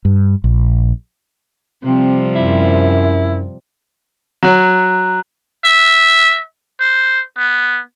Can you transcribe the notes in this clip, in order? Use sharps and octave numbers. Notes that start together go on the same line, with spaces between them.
G2
A#1
C3 F3 G3 C4
F#2 E4
F#3 A#5 F#6
E5
C5
B3